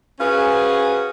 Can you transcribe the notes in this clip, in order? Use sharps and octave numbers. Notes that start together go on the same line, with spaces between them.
C#4 F#4 G#4 B4 C5 F5